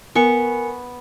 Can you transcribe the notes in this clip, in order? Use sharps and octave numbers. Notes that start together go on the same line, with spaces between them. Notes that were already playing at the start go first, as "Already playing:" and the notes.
B3 A#4 G#5 C#6 C#7